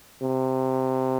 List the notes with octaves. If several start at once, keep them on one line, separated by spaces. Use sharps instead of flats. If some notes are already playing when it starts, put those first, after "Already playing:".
C3